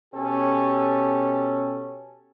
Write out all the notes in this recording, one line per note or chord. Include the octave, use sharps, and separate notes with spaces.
B2 C#4 G4 A4